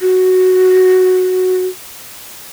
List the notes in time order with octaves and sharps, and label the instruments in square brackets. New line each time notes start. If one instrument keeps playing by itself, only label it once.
[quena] F#4